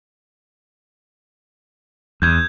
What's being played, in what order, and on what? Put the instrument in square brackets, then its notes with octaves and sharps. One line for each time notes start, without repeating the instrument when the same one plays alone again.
[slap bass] E2 [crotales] G6 G#6